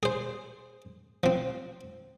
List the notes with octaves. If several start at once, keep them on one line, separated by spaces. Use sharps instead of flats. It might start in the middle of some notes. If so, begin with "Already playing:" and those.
G#4 C5
F3 C4